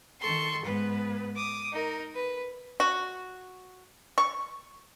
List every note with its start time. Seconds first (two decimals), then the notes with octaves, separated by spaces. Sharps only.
0.19 D#3 A4 C6 C#6
0.64 G#2 B3 B4
1.35 D6 D#6
1.72 D#4 A#4
2.14 B4
2.80 F#4
4.18 C#6